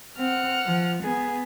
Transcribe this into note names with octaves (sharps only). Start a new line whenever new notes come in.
C4 F#5 F6
F3
B3 G#4